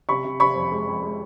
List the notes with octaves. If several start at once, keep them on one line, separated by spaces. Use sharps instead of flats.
C3 B5 C#6
C3
C3 B5 C#6
F2
G#3
F2
G#3